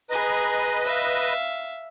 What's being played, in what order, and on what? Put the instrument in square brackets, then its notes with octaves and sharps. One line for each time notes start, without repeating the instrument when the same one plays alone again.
[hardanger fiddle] G#4 A#5 [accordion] B4 D#5
[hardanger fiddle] E5 F5